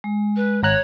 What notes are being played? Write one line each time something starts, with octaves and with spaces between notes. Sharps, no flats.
G#3
B4
G#1 C#5 A#5 F#6